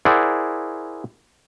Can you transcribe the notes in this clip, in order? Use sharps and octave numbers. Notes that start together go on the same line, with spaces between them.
E4 G#4 A#4 C5 D5 F#5